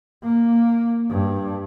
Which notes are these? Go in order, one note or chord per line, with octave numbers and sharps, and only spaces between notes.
A#3
G2